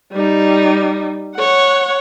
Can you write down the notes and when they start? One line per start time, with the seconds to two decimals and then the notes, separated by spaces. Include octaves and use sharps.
0.13 G3 D#4
1.36 C#5 F#5